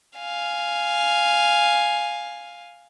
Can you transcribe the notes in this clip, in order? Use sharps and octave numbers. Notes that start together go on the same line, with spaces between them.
F5 G#5